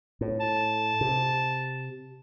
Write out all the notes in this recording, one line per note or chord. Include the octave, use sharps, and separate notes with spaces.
A2
A5
C3